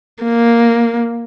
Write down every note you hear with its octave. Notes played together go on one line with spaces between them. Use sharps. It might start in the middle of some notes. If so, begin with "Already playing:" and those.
A#3